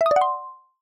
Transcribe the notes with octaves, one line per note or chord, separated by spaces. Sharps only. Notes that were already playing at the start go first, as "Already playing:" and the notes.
E5
D#6
D5
F#5
C6